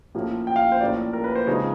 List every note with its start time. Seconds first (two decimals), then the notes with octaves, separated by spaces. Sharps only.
0.15 A2 F3 A#3 C#4
0.47 G5
0.56 F5
0.72 C5
0.81 A2 F3 A#3 C#4 D5
1.13 A#4
1.24 B4
1.35 C5
1.47 C#3 F3 G#3 C4 D#4 C#5